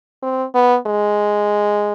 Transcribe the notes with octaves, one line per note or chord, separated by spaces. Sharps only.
C4
B3
G#3